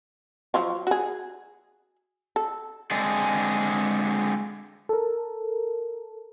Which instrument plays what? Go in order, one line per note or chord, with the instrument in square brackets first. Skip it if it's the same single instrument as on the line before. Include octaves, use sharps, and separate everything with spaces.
[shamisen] F3 F#3 F4
F#4 G#4
A4
[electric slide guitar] D3 G#3 C4 G#4 A4
[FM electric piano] A4 A#4